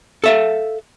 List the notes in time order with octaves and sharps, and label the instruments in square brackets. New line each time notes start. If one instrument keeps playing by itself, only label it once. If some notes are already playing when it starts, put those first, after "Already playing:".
[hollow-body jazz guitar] A4 E5 F5